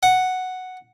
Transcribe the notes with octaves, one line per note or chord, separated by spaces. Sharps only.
F#5